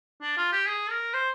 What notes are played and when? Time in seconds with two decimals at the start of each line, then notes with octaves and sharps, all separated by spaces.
0.22 D4
0.37 F4
0.52 G4
0.67 G#4
0.90 A#4
1.14 C5